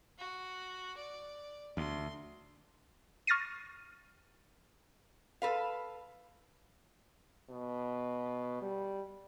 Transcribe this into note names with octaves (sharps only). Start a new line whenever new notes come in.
F#4
D5
D2 C6
C#6 F6 A6 A#6 C7 D#7
A4 B4 F5
B2
G3